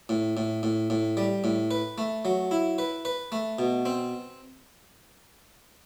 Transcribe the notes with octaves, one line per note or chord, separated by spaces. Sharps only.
A2
A2
A2
A2
G3
A2
B4
A3
F#3
E4
B4
B4
A3
B2
C4